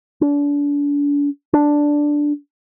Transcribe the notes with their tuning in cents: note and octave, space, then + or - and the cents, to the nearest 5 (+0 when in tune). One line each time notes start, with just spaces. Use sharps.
D4 -35
D4 +0